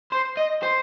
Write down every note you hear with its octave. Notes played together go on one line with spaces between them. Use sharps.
C5
D#5
C5